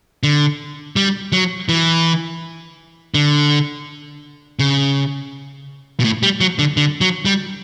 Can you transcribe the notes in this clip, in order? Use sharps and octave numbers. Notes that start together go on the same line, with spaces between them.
D3
G3
F#3
E3
D3
C#3
B2
A2
G3
F#3
D3
D3
F#3
G3